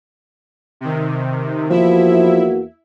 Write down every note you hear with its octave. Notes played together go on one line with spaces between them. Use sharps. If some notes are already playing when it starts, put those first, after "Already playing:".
C3 D#3
E2 F3 A#3 E4 F#4 E5